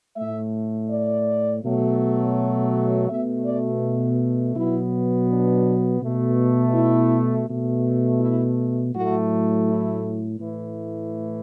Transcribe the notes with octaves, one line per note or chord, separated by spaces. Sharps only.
A2 A3 E5
D5
B2 F#3 A3
B2 A3 E5
D5
B2 F#3 B3 E4
D4
B2 A3
E4
B2 A3
E4
A2 F#3 A3 F#4
E4
A2 E3 A3